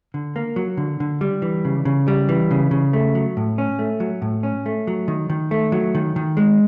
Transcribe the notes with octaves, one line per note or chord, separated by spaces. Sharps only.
D3
A#3
F#3
D3
D3
G3
E3
C#3
C#3
G3
E3
C#3
C#3
A3
F#3
A2
C#4
A3
F#3
A2
C#4
A3
F#3
D#3
D#3
A3
F#3
D#3
D#3
G#3